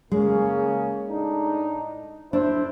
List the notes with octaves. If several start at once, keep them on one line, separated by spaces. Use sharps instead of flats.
C#3 G#3 A#3 C#4
A2 D4 D#4
D2 D4 E4 C5